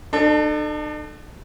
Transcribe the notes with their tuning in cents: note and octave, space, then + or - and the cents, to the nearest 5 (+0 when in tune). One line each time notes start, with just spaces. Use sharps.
D4 +45 A4 +0